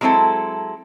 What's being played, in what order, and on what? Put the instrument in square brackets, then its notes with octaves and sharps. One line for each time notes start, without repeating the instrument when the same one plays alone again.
[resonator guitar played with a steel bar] F#3 G#3 C4 E4 A4